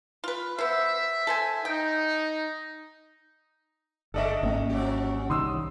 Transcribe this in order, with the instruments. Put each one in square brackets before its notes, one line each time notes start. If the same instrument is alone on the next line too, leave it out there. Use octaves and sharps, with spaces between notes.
[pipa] F4 B4
[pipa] B3 C5 [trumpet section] E5
[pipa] A4 C5 G#5
[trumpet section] D#4 [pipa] G5
[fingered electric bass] G1 [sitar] G#3 A3 D4 [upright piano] A4 D#5 E5
[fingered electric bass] G#1 A#3 [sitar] D3 [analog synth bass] C#4
[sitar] F3 F#3 G4
[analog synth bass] C2 [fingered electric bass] D#3 [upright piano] C6 D#6 E6